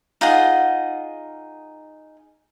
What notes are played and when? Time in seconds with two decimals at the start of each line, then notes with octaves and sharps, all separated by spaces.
0.21 D#4 F4 G#4 F#5